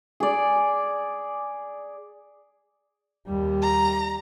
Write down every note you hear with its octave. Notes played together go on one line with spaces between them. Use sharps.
G#4 D5
D#2 G3
A#5